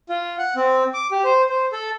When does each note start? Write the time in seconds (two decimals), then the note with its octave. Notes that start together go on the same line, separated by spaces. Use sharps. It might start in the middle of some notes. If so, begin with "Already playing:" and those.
0.09 F4
0.38 F#5
0.56 C4
0.94 D6
1.11 G4
1.24 C5
1.49 C5
1.72 A4